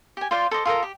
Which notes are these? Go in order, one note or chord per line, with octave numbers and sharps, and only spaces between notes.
G4 G#5
F4 C5 D5 F5
A4 C5 D#5 D6
F4 A4 A#4 D#5
G4